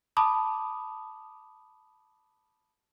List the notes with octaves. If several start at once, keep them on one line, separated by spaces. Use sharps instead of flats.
A5 B5 D6 D#6